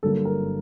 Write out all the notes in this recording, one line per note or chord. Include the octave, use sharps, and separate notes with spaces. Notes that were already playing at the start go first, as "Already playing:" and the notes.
G1 G2 F#3 A#3 A4
A#4